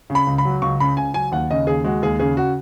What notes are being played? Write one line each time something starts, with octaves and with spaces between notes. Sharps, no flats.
C#3
B5
C#2
B5
F#3
C#2 C#6
C#3 B5
C#2 G#5
F#3 G#5
D#2 F#5
C#3 D#5
D#2 G#4
G#3 F#4
D#2 G#4
C#3 G#4
F#4